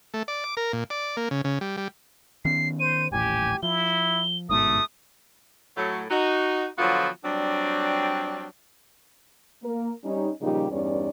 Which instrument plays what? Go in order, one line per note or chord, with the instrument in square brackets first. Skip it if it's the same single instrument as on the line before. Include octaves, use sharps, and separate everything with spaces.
[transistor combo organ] A3
D5
D6
A#4
A#2
D5
A#3
C#3
C#3
G3
G3
[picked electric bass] D#3 B3 C#4 [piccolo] C7
[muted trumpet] C5 [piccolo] D#7
[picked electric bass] D#1 A1 A2 [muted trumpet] G4 [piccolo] G#5
[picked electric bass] F3 [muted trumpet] E4 [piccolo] G7
[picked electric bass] G1 G#2 B2 [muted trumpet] A3 [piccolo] D#6
[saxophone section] A2 F#3 A3
D#4 F#4
D3 F3 F#3 B3 F4 F#4
F#3 G3 C4 D4
[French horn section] A#3 A#4
G3 C#4 D#4
A#2 C#3 F3 G3 D#4 G4
E2 G2 G3 C#4 D#4 D5